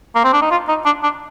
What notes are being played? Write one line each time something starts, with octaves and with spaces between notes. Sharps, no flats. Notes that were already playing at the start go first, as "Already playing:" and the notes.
A#3
C4
D4
D#4
F4
D#4
D4
D4